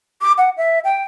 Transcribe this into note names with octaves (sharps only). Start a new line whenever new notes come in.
D6
F#5
E5
G5